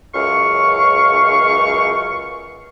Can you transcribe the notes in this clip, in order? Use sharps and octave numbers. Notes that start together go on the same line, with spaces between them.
C#2 F#2 F5 C#6